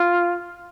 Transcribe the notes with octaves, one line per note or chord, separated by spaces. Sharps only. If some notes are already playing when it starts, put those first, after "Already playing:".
Already playing: F4